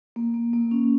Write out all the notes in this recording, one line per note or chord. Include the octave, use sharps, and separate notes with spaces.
A#3
A#3
A#3
C#4